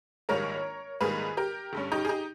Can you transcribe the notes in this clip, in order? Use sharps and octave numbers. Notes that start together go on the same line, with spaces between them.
A#1 G#2 D#3 G3 A#3 A#4 C#5
A#1 G#2 D#3 G3 A#3 G#4 B4
G4 A#4
G1 G2 G3 C#4
D#4 G4
G#4
D#4 G4